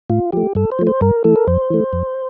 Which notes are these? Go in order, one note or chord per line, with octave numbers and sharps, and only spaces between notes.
A2 F4
F3 A3 G4
G2 A4
C5
F3 A3
C5
G2 A#4
E3 A3 A4
A#4
F2 C5
E3 A3
F2